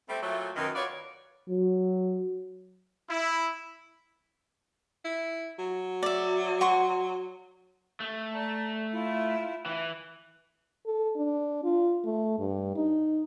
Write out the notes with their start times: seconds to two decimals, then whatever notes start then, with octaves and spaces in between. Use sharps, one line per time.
0.09 G3 A3 C4
0.22 A#2 F#3 A3
0.56 F#2 B2 D#3
0.74 F4 F#4 B4 C#5 D5
1.49 F#3
3.09 E4
5.05 E4
5.58 F#3
6.03 D5 E5
6.61 F#5 C6 C#6
8.00 A3
8.34 D5 A5 A#5
8.92 E4 F4
9.66 E3 E4
10.86 A4
11.16 D4
11.64 F4
12.05 A3
12.38 G2
12.76 D#4